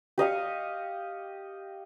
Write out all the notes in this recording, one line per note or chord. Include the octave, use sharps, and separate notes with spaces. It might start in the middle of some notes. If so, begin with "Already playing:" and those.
G4 D#5 F5 C#6